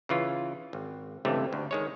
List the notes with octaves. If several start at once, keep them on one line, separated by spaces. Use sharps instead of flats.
C#3 E3 F4
G#1
C#2 G2 C3 E3 A3
D2
D#3 G#3 C#5